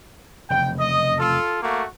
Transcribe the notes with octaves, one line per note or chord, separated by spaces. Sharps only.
F1 E2 C#3 G5
D#5
F4 A4
A3 A#3 F#4